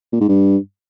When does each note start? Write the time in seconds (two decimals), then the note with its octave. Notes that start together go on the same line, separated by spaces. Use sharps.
0.13 A#2
0.21 G#2
0.29 G2